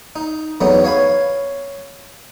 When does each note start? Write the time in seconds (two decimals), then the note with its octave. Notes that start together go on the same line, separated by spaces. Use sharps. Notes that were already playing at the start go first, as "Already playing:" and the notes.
0.16 D#4
0.61 E2 F#3 A3 B3 D#4
0.84 C#5 F5 G#5 B5